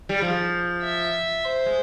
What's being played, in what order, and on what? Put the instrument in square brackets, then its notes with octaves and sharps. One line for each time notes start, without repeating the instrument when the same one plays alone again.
[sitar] G3
F3
[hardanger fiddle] E5
C5
[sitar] G#3